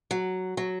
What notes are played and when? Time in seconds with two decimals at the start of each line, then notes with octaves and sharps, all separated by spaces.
0.11 F#3
0.57 F#3